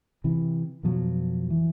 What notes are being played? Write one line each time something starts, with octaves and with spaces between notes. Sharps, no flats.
C3 E3
F2 B2 F3 F#3
E3